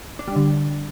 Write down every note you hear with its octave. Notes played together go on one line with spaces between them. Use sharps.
D4
G3
D3